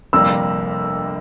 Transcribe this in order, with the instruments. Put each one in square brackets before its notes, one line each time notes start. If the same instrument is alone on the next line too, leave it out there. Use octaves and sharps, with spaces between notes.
[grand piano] G1 F2 C3 G3 A#3 [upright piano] E6